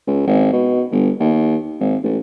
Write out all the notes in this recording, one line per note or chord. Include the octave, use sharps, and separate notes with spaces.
C#2
G#1
B2
G1
D#2
G#1
A1